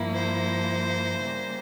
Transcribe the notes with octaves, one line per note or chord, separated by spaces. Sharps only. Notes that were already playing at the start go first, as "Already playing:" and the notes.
Already playing: G2 F3 A#3 E4
C5
C#3 G3 A#3